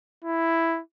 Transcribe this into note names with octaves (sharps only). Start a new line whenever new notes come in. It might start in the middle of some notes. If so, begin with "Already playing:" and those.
E4